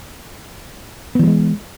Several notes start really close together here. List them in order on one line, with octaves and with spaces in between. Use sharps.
B3 E3 G3 G#3